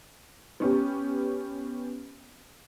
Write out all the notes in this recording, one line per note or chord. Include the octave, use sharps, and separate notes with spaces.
B3 C#4 G4